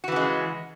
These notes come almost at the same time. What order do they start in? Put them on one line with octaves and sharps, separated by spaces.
F#4 E3 C#3 G#3